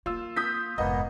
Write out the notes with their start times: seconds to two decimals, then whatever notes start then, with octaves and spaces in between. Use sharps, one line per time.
0.06 A#3 F4 E6
0.36 D#6 G6 B6
0.78 F1 G#2 A#3 B3 D#5